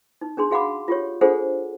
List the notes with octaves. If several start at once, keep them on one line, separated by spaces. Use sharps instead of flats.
D#4
C#4 D4 G#4 C6
F#4 G#4 F5 F#5 B5 D6
F4 G4 C#5
D4 F4 G#4 A4 C5 F#5